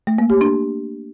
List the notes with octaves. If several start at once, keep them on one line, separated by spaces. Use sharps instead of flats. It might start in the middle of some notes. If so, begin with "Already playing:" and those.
A3
A#3
G4
D4